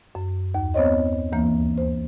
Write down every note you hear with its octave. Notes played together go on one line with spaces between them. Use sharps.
F#2
D#2
B3 C4 C5 C#5 D#5
D2 E3 A#3
C5